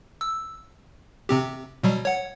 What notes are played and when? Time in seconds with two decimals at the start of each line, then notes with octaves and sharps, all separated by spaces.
0.21 E6
1.29 C3 C4 G4
1.83 B2 F#3 G3
2.05 C#5 F#5